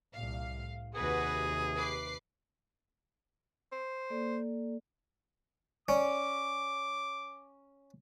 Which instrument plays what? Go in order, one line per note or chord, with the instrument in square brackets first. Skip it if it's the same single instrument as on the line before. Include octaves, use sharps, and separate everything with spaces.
[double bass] C2 A#2 [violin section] F5
[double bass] A2
[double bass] D#2 C3 [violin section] F#4 B4 [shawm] G#4
[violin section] B4 D6 C7
[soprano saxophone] C5
[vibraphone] A#3 A4 D5
[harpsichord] C#4 [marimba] D5 [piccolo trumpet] D6